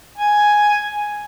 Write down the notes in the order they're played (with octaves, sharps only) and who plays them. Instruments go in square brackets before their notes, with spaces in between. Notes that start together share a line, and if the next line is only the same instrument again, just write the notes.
[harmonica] G#5